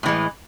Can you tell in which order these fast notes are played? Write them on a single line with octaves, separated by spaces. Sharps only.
A2 E3 G#3